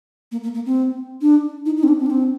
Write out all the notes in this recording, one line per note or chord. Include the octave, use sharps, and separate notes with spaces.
A#3
A#3
A#3
C4
D4
D#4
D#4
C4
D4
C4
D4
C4